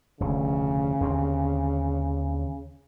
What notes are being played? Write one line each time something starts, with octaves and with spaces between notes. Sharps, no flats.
F1 D2 C#3
D#2 D3 C4